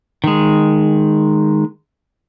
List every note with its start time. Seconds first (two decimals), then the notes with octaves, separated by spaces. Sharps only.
0.24 D#3 G#3